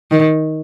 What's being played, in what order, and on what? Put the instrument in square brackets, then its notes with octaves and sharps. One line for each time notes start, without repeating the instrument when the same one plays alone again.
[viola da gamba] D#3